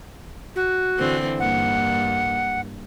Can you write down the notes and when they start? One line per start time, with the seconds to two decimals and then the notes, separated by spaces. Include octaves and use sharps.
0.56 F#4
0.98 D3 E3 C4
1.40 G2 A#3 F#5